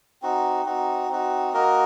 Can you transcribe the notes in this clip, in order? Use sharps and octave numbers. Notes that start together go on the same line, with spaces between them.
C4 D#4 F#4
C4 D#4 F#4
C4 D#4 F#4
A#3 F#4 A#4 D#5